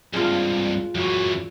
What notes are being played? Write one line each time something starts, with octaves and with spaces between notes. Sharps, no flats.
C2 G2 G#3 F4
F#2 E3 F#4